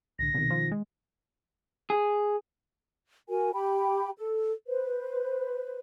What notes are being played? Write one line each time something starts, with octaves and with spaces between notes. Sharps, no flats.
C2 A2 D3 A#6
C2 B2 D#3
F3
G#3
G#4
F#4 A#4 G#5
G4 G5 B5
A4
B4 C5